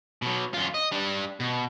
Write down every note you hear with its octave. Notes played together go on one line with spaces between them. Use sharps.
B2 F#3
F#2 F4
D#5
G3 D4
B2